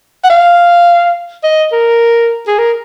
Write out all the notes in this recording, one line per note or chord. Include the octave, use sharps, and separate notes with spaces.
F#5
F5
D#5
A#4
G#4
A#4